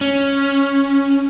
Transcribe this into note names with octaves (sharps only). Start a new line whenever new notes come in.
C#4